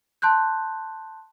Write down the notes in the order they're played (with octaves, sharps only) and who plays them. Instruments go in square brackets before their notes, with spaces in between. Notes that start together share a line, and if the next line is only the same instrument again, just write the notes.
[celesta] A5 C6 F#6 G6